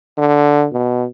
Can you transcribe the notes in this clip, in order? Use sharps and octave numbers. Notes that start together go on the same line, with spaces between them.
D3
B2